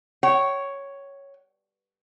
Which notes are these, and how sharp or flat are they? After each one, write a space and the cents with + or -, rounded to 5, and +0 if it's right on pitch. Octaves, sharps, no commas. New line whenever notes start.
C#5 +0 G5 -40